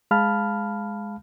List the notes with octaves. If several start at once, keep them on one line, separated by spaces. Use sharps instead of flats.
G#3 F5 A5 B5 F6